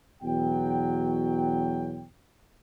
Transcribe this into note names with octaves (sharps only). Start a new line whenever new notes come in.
E2 B2 F#3 G5